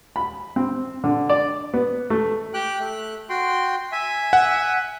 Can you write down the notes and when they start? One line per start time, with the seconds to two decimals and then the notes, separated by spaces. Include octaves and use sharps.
0.16 B5
0.56 C4
1.04 D3
1.30 D5
1.74 B3
2.10 A3
2.54 G4 G5 F#6
2.79 A3 F#6
3.29 F#4 G5 C6
3.92 E5 G#5
4.33 F#5